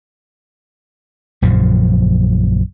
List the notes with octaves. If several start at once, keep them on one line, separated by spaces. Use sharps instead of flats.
A#1 F#2 C#3 F3